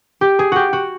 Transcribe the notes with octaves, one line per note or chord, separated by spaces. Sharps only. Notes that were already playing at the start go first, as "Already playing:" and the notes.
G4
G#4
F#4 G4
F#4